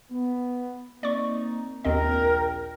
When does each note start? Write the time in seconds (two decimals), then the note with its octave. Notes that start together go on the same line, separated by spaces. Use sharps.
0.10 B3
1.03 A#3 C4 D#4 D5 C#6
1.85 A#1 D#2 C4 A#4 D#5 G5